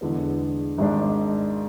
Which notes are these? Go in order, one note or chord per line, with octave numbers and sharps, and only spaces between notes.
E2 D3 G#3 B3
G#1 G#2 G#3 D4